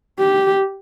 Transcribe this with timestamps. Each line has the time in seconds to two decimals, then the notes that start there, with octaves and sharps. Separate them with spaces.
0.19 G4